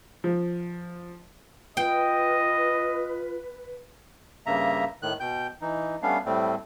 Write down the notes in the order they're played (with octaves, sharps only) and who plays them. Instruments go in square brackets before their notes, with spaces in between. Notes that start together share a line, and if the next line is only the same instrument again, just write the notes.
[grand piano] F3
[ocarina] F4 [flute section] B4 [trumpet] D#5 [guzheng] G5
[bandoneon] G2 C#3 A#3 E5 A#5
A2 D#3 F#6
B2 G5 G6
E3 D#4
G3 A3 B3 C#4 D4 F5
A2 G3 A3 C4